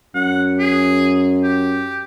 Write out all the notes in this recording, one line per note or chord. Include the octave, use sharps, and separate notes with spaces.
F#2 F#5
G#4
G4